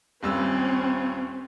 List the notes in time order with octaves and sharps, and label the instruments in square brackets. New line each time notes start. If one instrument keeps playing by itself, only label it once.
[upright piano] D#1 G2 E6 [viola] C4 C#4